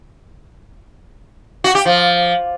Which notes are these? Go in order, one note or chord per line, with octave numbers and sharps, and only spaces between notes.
F#4
G4
F3